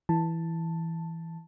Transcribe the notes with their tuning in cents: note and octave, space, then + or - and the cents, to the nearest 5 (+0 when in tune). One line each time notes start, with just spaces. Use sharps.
E3 +0 A5 +5